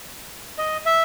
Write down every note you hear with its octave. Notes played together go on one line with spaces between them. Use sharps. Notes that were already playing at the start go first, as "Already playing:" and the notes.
D#5
E5